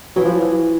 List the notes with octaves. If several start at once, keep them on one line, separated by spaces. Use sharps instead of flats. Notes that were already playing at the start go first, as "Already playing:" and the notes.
E3 F#3
F3